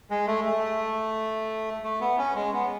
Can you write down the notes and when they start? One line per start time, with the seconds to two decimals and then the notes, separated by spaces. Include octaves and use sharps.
0.10 G#3
0.27 A3
0.45 A3
1.84 A3
2.01 B3
2.18 C#4
2.35 G#3
2.53 B3